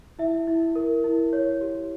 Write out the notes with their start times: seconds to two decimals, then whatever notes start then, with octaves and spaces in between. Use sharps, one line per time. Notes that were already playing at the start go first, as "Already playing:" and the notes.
0.19 E4 E5
0.47 E4
0.75 A#4
1.04 E4
1.33 C#5
1.61 G4